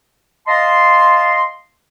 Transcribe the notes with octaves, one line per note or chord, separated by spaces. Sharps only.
D#5 F5 A5 C6